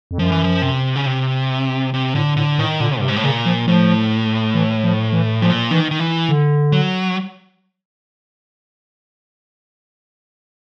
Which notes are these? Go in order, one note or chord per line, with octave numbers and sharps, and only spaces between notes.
F2
F#2 F3
E3
F3
C3
C#3
C3
C3
A2 D3
A2 D3
A2 D#3
A#2 D3
G2 C3
G#2
A2
A#2 C#3
F3
A2 F3
E3
F3
E3
A#2 F3
D#3 E3
D#3
E3
D3
F#3